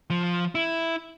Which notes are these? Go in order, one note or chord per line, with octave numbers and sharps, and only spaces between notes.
F3
E4